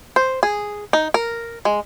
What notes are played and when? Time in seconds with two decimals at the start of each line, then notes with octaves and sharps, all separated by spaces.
0.16 C5
0.43 G#4
0.93 D#4
1.14 A#4
1.65 G#3